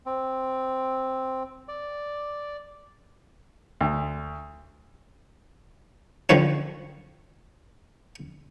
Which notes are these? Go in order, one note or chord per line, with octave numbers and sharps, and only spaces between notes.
C4
D5
D2
D3 D#3 F3 C#4